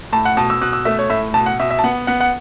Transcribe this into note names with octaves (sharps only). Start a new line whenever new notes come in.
A2 A5
F#5
B2 A5
E6
B2 F#6
E6
A3 E5
C#5
A2 E5
B2 A5
F#5
B2 E5
E5
A5
B3 F#5
B3 F#5
F#5